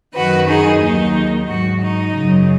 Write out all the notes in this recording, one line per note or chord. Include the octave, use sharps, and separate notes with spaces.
F#2 D#3 F#3 F#4 B4
D#4 G#4
D#2 D#3 F#3 D#4
G#2 F#3 F#4
D#4
F#2 C#3 F#3